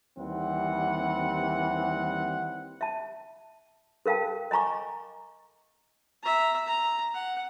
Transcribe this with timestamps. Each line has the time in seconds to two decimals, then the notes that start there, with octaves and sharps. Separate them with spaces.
0.18 D#2 E3 G3 C4 F#5
2.81 E5 A5
4.06 A4 A#4 F5 G5 A5
4.51 D#5 G#5 A#5 C#6 D6
6.23 E5 A#5
6.66 A#5
7.14 F#5